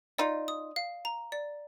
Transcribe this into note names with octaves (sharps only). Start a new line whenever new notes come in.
D#4 F4 D5
D#6
F5
A#5
D5